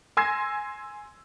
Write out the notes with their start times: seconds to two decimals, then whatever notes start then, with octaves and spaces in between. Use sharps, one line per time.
0.17 G#5 C6 E6 G#6 A#6 C7